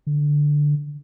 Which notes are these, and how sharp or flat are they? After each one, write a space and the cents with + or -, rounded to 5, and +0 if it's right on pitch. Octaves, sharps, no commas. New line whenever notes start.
D3 +0